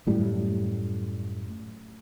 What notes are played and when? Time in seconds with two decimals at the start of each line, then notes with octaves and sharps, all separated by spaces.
0.07 F#2 A2 G3